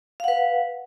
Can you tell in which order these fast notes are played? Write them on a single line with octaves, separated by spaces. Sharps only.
F5 F#5 B4